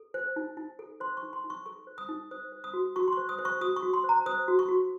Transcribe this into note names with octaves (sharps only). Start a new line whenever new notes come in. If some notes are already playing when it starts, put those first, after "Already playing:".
Already playing: A4
C5
D#4
D#4
A4
C5 C6
C#6
D#4
C6
D#4
C#6
A4 C#6
C5
D#6
D#4
C5 D#6
C5
D#6
F#4
F#4 C#6
C6
C5 C#6
D#6
C5
C#6
F#4 D#6
C#6
F#4
C6
C5
A#5
C5 D#6
F#4
C#6
F#4